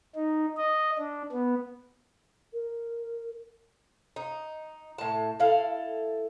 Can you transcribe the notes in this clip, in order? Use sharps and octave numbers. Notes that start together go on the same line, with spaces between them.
D#4
D#5
D4
B3
A#4
D#4
A2 A5
E4 A4 F5